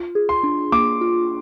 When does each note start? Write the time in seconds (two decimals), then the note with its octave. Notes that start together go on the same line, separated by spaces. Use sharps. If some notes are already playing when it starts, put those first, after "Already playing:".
Already playing: F4
0.15 G#4
0.29 C6
0.43 D4
0.72 A#3 D6
1.01 F4